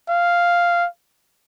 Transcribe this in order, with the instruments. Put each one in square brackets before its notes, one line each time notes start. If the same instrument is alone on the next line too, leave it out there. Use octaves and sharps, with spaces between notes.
[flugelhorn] F5